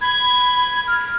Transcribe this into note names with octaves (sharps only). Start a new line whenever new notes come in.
B5 G#6
F6